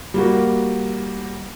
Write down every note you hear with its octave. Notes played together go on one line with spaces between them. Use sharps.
G3 A#3 F#4